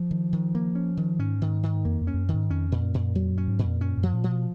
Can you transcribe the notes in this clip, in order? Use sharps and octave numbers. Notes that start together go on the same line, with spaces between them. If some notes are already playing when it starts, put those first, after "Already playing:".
Already playing: F3
D#3
D#3
A#3
C#4
D#3
G#2 C#4
D#3
D#3
F2 A#3
F2
C#4
F2
F#2
D#3
G#2
F2 C#4
A#2
F#2
A#2
F2 F#3
F#2
C#4
G#2
A#2
F2
F#2 C#4
F#2
F3
A#2
F3
B2